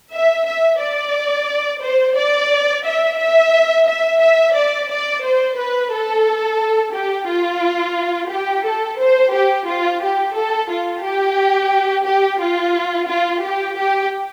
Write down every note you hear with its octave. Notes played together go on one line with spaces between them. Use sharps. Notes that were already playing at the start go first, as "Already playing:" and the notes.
E5
E5
D5
C5
D5
E5
E5
E5
E5
D5
D5
C5
B4
A4
G4
F4
G4
A4
C5
G4
F4
G4
A4
F4
G4
G4
F4
F4
G4
G4